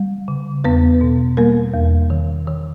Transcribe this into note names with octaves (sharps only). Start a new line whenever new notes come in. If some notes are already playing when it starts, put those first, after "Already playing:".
Already playing: G3
C#3
E2 B3 B4
B2
G3 A#3 A#4
E2
D#3
D#3